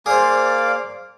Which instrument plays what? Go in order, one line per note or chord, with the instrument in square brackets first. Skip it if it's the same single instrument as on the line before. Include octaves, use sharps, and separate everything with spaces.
[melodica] A#3 F5 D6 [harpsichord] G#4 C5 [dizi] D5